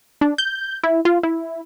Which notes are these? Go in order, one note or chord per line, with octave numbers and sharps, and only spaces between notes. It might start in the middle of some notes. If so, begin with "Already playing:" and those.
D4
G6
E4
F4
E4